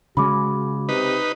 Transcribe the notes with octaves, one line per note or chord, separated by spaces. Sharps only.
C#3 G#3 F#4 B5 D6
C3 D#4 B4